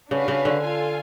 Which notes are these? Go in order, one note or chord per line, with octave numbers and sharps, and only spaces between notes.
C#3 D4 F#4 B4 F5
C#3
D3
F4 A4 F5 G#5